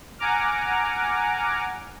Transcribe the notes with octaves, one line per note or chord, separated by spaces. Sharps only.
F#5 G#5 A#5 D6 F6